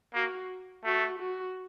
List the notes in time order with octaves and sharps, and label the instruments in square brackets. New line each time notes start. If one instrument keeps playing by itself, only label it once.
[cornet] A#3 [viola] F#4
[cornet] A3 [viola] F#4
[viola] F#4